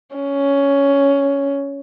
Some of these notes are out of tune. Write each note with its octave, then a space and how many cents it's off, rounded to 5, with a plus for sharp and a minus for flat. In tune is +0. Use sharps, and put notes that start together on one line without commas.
C#4 +10